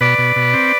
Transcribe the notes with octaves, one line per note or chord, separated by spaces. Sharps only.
B2 B4 D5
B2
B2
C4